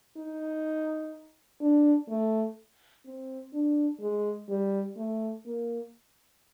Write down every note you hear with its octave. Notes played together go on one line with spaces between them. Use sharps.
D#4
D4
A3
C4
D4
G#3
G3
A3
A#3